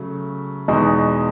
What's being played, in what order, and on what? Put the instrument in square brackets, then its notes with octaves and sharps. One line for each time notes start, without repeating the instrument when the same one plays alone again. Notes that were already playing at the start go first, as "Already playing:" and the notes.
Already playing: [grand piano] C#3 F#3 A3
E2 B2 G#3 D#4 F#4